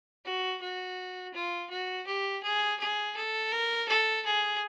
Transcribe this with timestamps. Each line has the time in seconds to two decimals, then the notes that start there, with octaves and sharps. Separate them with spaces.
0.25 F#4
0.61 F#4
1.34 F4
1.70 F#4
2.06 G4
2.43 G#4
2.79 G#4
3.16 A4
3.52 A#4
3.88 A4
4.25 G#4